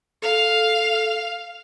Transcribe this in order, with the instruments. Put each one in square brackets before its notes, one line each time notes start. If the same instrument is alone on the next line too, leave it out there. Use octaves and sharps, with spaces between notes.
[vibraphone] A4 [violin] F5 F7